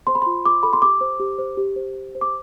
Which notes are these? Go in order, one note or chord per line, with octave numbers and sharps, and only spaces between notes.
C5 C6
B5
C6
F4
F4 D6
A4 B5
C6
G4 D6
C5
G4
C5
G4
C5
G4
C5
D6